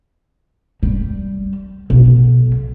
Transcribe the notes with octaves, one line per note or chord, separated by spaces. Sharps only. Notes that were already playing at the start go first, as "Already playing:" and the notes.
G3
B1